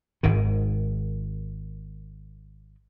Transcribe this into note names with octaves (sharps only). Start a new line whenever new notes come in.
G#1 G#2 D#3